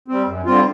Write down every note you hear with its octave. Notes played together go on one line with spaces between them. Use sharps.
G3 C4
F#2
D3 G3 C4 F4